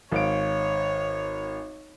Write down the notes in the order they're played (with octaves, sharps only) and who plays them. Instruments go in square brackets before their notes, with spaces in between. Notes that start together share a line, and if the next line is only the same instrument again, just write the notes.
[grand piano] G#1 F5 D7 [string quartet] C#5